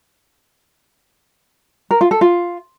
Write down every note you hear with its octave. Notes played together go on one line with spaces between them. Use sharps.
A#4
F4
A4
F4